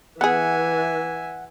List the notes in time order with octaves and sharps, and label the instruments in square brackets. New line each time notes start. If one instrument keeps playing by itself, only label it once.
[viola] E3 [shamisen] B3 G#4 [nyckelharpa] E5 G#5 [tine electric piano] F#5